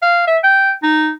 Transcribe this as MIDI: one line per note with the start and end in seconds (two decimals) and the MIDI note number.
0.02 0.24 77
0.27 0.38 76
0.43 0.72 79
0.83 1.10 63